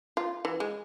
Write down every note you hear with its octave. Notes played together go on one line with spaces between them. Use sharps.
F4
E3
G#3